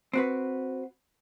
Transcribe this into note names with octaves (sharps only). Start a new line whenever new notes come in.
C4 F#4 B4